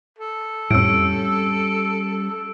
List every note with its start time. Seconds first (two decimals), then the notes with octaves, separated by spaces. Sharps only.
0.19 A4
0.71 F2 A2 G3 C#4 E6 D7